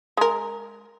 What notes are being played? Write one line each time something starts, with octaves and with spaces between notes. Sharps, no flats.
G#3 A#4